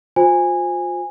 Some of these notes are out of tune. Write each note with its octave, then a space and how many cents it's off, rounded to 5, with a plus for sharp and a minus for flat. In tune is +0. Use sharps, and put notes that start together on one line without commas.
F4 +35 C5 +0 G#5 -15